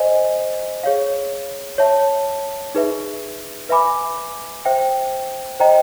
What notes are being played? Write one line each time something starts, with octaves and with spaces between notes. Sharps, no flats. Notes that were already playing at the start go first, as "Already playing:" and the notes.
Already playing: C5 D#5 G#5
G#4 C#5 F5
C#5 E5 A5
D#4 G#4 B4 E5
B4 E5 G#5 B5 D6
C5 E5 G5
C5 D#5 G5 A#5